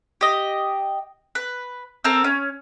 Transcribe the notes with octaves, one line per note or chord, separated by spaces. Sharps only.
G4 D#5
B4
C4 A4 A#4
C#4